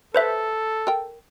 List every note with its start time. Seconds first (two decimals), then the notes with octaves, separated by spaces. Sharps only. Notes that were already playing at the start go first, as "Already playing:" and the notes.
0.15 A4 B4 C5 E5
0.87 A#4 G5